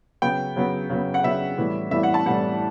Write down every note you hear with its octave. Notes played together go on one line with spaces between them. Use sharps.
C#3 F#3 B3 G5
C#3 F#3 B3
C#3 F#3 B3
F#5
C#3 F#3 B3 E5
A2 E3 G3 B3
A2 E3 G3 B3 E5
F#5
A5
A2 E3 G3 B3 F#5